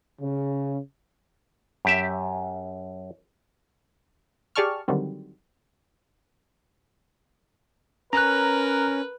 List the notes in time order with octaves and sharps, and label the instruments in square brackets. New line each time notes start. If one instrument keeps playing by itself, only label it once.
[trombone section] C#3
[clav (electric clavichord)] F#2 G4 E5
[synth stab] G4 G#4 D5 A5 C#6 F6
D3 D#3 F#3 G3 C4
[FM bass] C#4 [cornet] A#4 [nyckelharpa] B4 [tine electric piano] A#5 F#6